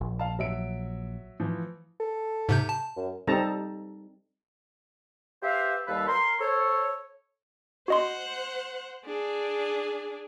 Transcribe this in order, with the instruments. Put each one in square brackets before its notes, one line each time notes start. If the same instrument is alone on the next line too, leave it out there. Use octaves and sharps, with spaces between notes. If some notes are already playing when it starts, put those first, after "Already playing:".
[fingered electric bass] A#1
[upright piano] F5 A5
F#3 E5 D7
E3 F3
[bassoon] A4
[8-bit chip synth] G#2 C3 G6
A5
[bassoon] F#2
[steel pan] G3 C4 D#4 A4 A5 A#5
[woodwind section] G4 B4 C5 E5 F5
D#2 G3 A4 B4 F5
A#4 C6
A4 C5 C#5
[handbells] F#4 D#5 C6 [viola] C5 F#5
[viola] D4 G#4